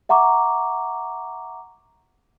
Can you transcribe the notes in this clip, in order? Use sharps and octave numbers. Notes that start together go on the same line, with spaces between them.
E5 F#5 A#5 C#6 D6